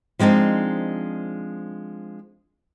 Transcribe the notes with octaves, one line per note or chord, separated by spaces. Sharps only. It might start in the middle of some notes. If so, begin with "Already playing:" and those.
F3 G#3 C4 D4 D#4